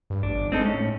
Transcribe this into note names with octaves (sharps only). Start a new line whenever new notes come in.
G2
A1 D4
G1
G#3 C4 D#4 A4
A2 C#4